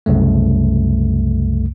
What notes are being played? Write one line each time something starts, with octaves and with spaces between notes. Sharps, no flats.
C2 F#2 C#3 A3